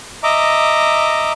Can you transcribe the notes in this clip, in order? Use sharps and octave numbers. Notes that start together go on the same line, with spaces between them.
D#5 E5 A#5 D6